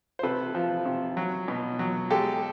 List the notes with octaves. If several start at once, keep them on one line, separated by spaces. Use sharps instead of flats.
C5
C3 A4 B4
F3
C3
F#3
B2
F#3
G#3 G4 A4